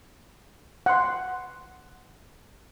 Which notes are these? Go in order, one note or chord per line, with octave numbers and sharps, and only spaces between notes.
F#5 C6